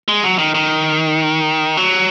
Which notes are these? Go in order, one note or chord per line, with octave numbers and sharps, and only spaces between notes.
G#3
F#3
D#3
D#3
F#3